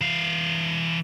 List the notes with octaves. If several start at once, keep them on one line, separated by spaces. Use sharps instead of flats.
E3 F5